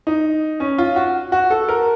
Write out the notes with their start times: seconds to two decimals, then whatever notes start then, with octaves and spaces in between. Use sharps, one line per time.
0.07 D#4
0.60 C#4
0.78 F4
0.96 F#4
1.32 F#4
1.50 A4
1.69 A#4